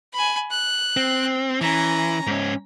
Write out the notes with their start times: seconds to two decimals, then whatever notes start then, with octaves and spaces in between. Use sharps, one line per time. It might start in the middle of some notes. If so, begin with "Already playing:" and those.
0.14 G#5 B5
0.51 F#6
0.97 C4
1.61 E3 C#4 A#5
2.27 G#2 C#4